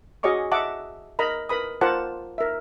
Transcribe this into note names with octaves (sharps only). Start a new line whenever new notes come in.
F#4 G#4 C#5 D#5 C#6 D6
D#5 E5 F#5 A5 D6
A#4 D#5 A#5 B5
A#4 B4 B5 D#6
F4 A#4 C5 F#5 A5 D6
A#4 E5